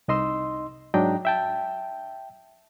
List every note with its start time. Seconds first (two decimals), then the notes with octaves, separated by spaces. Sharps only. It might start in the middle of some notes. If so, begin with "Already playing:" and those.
0.08 C2 D#4 D#5 C6 E6
0.94 G#2 F#3 D4 D#5 G5 A#5
1.25 E5 G5 A5